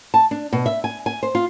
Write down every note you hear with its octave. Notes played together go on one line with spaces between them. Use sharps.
A5
D4
B2
E5
G#5
G#5
C5
F4